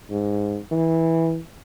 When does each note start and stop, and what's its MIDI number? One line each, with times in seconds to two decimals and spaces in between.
0.10 0.57 44
0.71 1.39 52